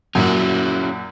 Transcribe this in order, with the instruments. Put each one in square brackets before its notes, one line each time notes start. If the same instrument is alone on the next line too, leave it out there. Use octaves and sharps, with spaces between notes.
[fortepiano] F#2 A#2 [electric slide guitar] C#4 E4 F#4